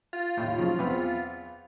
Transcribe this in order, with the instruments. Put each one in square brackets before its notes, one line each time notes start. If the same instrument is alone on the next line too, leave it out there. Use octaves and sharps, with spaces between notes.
[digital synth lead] F4
[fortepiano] D#2 A2
C#3 F3 F#3
E2 B3 C4